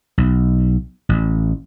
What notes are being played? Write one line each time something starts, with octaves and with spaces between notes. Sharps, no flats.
B1
A1